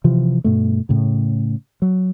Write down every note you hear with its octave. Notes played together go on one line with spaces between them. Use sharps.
C3 E3 F3
G2 B2 A3
A2 C#3
F#3